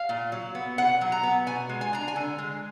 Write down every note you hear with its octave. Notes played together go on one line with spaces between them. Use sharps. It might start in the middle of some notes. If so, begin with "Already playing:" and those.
Already playing: F5
A#2
F#3
B3
B2 F#5
F#3
A#5
B3
B2 G#5
G#3
G#5
D4 A#5
G#5
D3
G#3